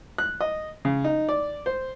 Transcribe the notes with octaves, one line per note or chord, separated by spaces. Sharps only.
F#6
D#5
C#3
D#4
D5
C5